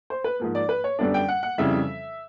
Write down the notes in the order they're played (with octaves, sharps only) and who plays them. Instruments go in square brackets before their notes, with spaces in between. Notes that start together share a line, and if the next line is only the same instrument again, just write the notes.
[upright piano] C5
B4
G#2 F3 A#3
D5
B4
C#5
F#2 D3 G3 B3 D4
G5
F#5
F#5
F2 C#3 E3 G3 E5